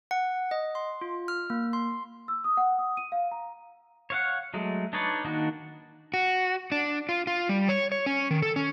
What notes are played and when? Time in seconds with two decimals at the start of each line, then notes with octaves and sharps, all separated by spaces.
0.11 F#5
0.51 D#5
0.75 C6
1.01 F4
1.28 F6
1.50 A#3
1.73 C6
2.28 E6
2.44 D#6
2.57 F#5
2.79 D#6
2.97 D#7
3.12 F5
3.31 A#5
4.10 C#5 F5 F#5
4.54 F#3 G#3 A3
4.93 D4 D#4 B4 C#5 D5
5.24 D#3 A#3 D4 D#4 F#4
6.14 F#4
6.72 D4
7.09 F4
7.27 F4
7.49 G3
7.69 C#5
7.92 C#5
8.06 C#4
8.31 D#3
8.42 A4
8.56 C#4